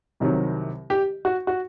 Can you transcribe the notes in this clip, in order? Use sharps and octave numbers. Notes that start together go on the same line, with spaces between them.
C2 C3 D#3 F#3
G4
F#4
F#4